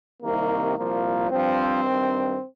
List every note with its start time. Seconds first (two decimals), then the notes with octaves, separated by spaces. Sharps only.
0.23 C2 C3 D#3 A#3
0.77 C2 A#2 F3 A#3
1.31 G2 F3 C4
1.85 G2 D#3